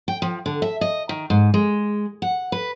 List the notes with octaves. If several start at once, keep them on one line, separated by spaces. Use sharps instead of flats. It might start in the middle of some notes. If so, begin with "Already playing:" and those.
G5
F3
D3
E5
D#5
D#3
G#2
G#3
F#5
B4